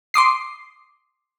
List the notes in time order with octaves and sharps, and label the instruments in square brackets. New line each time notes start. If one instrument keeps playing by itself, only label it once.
[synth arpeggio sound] C6 D6 D#6 C7